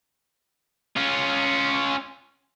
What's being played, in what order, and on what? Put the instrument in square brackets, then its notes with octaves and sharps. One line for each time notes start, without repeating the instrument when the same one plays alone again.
[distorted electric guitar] C#4 F4